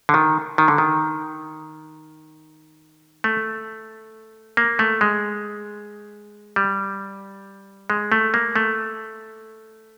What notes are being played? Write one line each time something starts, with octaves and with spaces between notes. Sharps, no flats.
D3
D#3
D#3
D3
D#3
A3
A#3
A3
G#3
G3
G#3
A3
A#3
A3